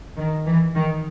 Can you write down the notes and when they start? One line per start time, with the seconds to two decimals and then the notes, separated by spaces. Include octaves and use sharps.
0.18 D#3
0.46 E3
0.75 D#3